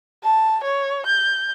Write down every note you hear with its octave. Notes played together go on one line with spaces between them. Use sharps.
A5
C#5
G6